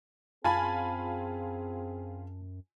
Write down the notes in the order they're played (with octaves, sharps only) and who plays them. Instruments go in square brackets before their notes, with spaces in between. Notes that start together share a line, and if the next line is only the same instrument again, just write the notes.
[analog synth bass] F#2 [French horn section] C4 G#4 [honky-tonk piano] F4 G#5 B5 [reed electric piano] A5